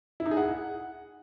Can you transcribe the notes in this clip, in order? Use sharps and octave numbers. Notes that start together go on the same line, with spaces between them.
E4
D#4
G#4
F#5